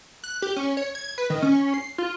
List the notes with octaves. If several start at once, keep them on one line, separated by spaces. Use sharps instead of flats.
F#6
G4
C#4
C#5
G#6
B4
D#3
C#4
C7
F4